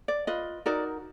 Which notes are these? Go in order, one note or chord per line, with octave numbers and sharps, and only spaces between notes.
D5
F4 B4 D#5
D#4 F#4 A#4 D5